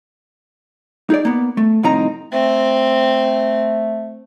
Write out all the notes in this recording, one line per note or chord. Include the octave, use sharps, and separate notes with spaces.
D#4 G#4 D5
A#3 B3
A3
C2 F2 A2 C4 D#4 A#5
A3 C4